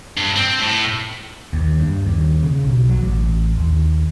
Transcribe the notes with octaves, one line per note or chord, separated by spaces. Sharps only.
G2
C4
A2
D#2
G2
D#2
C#3
B1
F#3
A1
D#2